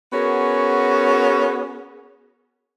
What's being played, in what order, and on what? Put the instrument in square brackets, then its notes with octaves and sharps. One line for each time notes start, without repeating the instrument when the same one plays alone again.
[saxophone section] B3 C#4 F#4 G#4 A#4